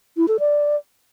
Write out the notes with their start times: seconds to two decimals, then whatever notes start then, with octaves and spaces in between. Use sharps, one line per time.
0.17 E4
0.28 A4
0.39 D5